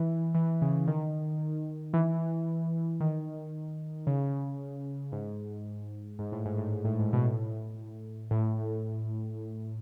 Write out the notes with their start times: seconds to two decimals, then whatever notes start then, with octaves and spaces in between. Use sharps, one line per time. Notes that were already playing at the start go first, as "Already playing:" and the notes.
Already playing: E3
0.35 E3
0.62 C#3
0.88 D#3
1.94 E3
3.00 D#3
4.07 C#3
5.12 G#2
6.19 G#2
6.32 A2
6.45 G#2
6.58 A2
6.72 G#2
6.85 A2
6.99 G#2
7.13 B2
7.25 A2
8.31 A2